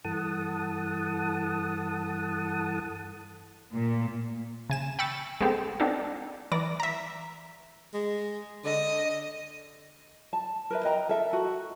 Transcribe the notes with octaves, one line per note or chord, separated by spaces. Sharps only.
G2 E3 A4 F#5 A5 D#6
A#2
C#3 G#5 E7
G5 B5 C#6 E6 A6
G#3 B3 C4 G4 A4
B3 C4 D4 D#4 A4
E3 D5 A#5 A#6
E5 A#5
G#3
D3 D#5
A5
A#4 B4 E5
D#5 G5 A#5
A4 A#4 E5
F#4